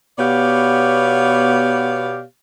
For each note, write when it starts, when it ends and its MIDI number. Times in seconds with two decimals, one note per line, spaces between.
0.18 2.22 47
0.18 2.22 59
0.18 2.22 67
0.18 2.22 73
0.18 2.22 74
0.18 2.22 77